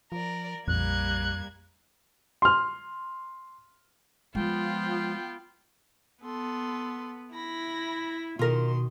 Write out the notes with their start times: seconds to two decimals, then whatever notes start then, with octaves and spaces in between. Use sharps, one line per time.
0.12 F3 A#4 D5
0.68 A#1 F2 G3 A#3 F#6 G#6
2.42 C6 F6
4.35 F3 G#3 B3 F4 G5
6.24 B3 A4 C6
7.34 E4 B5 A#6
8.39 B2 D#3 F4 A#4 C6